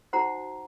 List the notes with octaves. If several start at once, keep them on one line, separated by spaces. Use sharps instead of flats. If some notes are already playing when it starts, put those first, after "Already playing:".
D#4 F#4 C5 F#5 A#5